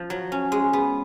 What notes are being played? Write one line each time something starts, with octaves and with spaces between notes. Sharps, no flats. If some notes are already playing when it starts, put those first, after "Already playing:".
Already playing: F3
F#3
C#4
G#3
B3